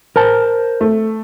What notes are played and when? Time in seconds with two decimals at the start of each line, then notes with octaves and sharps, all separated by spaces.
0.16 A#4 C5 A5
0.81 A3